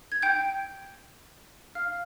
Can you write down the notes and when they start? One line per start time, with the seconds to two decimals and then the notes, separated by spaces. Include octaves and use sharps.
0.12 G#6
0.22 G5 G6
1.75 F5 F6